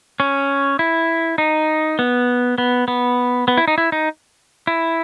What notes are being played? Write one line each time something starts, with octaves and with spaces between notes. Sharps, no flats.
C#4
E4
D#4
B3
B3
B3
B3
E4
D#4
E4
D#4
E4